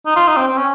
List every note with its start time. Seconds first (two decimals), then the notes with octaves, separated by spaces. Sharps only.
0.06 D#4
0.16 F4
0.27 D#4
0.37 C4
0.48 C4
0.57 C#4